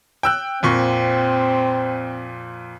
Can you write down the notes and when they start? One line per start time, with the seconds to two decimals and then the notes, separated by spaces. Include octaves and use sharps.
0.23 G5 E6 F#6
0.63 F2 A#2 C4 C#6